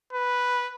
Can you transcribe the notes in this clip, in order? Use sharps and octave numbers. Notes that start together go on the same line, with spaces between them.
B4